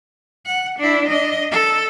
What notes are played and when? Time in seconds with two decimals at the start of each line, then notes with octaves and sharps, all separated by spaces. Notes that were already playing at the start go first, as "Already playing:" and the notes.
0.46 F#5
0.78 D4 E4
1.08 D4 D#5
1.52 A4